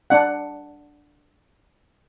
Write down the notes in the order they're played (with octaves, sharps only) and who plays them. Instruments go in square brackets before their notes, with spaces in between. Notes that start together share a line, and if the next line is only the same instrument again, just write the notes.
[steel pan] D4 F#5